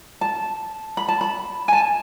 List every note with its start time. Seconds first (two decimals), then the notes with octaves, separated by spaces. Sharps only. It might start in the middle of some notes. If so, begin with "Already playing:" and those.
0.21 A5
0.97 B5
1.08 A5
1.21 B5
1.68 G#5
1.73 A5